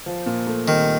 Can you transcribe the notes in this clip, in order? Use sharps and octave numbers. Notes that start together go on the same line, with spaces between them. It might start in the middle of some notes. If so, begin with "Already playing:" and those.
F3
A#2
A3
C2 D#3